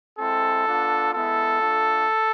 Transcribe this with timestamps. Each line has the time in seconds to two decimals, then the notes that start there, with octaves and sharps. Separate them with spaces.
0.19 G#3 C4 E4 A4
0.67 B3 D4 F4
1.13 G#3 B3 E4 A4
1.60 A3 D4 F4